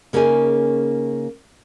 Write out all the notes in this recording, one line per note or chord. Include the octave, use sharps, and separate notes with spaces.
C#3 A#3 C#4 D#4 G#4